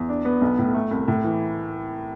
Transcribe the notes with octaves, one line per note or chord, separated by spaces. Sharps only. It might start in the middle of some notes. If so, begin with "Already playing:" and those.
Already playing: E2
D4
B3
B1
A2
A3
C2
A2
E3